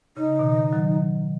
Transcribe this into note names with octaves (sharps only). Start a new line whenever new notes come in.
C#3 D#4
B2 D#3
D#3 F#3